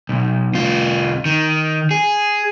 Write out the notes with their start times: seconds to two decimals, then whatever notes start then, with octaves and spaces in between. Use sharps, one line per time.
0.09 B1
0.54 C2 F4
1.25 D#3
1.91 G#4